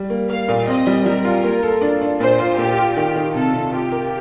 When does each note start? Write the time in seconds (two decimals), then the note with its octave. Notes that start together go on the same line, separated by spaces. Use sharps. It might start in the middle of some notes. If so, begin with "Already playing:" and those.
Already playing: G3
0.10 A#3
0.29 A#3 F5
0.48 A#2
0.67 C4 D#5
0.87 G3
1.06 G3 A#4
1.25 F4
1.44 A#3
1.63 A4
1.82 D4
2.01 D4
2.20 A#2 C5
2.39 F4
2.58 A#2 G4
2.77 F4
2.97 D#3 G4
3.16 D#3
3.35 C3 A4
3.54 C3
3.73 F4 G4
3.92 A#4